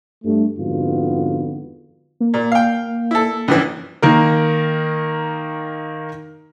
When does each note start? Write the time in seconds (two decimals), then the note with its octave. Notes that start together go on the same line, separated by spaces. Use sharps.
0.23 G2 A3
0.57 F2 G#2 D3 B3 F4 F#4
2.20 A#3
2.34 A#2
2.52 F5 G5
3.11 E4 A4
3.48 A#1 G2 E3 C#4
4.02 D#3 A#3 A#4